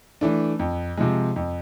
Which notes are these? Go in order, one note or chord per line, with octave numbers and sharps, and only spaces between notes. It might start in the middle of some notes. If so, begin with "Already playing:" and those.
E3 A3 D4
F2
C3 F3 G#3
F2